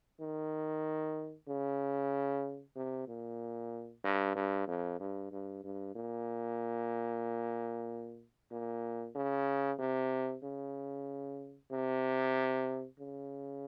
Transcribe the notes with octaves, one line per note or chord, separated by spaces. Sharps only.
D#3
C#3
C3
A#2
G2
G2
F2
G2
G2
G2
A#2
A#2
C#3
C3
C#3
C3
C#3